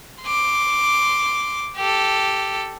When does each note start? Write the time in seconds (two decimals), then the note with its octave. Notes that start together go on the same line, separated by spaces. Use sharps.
0.23 C6 D6
1.77 G4 A4